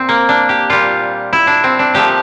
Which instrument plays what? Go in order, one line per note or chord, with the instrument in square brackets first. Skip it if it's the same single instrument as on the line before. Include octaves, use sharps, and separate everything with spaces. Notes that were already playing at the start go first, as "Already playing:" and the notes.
Already playing: [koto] A#2 C4
A#3
D4
G4
A#2 G3 F4
E4
D4
C4
D4
A#2 F3 A3 G4